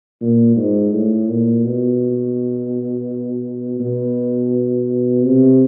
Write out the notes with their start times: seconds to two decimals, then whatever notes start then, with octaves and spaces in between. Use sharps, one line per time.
0.21 A#2
0.56 G#2
0.93 A2
1.29 A#2
1.65 B2
3.80 B2
5.23 C3